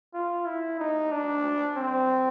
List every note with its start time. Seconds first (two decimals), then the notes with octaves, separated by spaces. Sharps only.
0.14 F4
0.46 E4
0.80 D#4
1.12 D4
1.76 C4